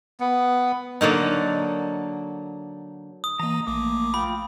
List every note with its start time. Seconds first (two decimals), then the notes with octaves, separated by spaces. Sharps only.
0.20 B3
1.01 D3 F#3 A#3 D#4
3.24 D#6
3.40 E3 A#3 D#5 A#5
3.67 A#1 A3 A#3 D6
4.14 F4 G5 B5